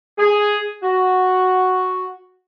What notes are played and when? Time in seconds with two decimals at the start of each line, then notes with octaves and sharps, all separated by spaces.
0.18 G#4
0.83 F#4